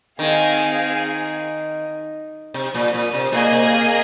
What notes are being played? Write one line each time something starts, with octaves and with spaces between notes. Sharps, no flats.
D#3 C4 G#4 F5 G#5
C3
A#2
A#2
C3
A#2 A#3 G#4 D#5 G#5
C3
C3